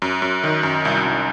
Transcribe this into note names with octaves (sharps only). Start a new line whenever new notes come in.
F#2
F#2
D#3
F#2
C2
C2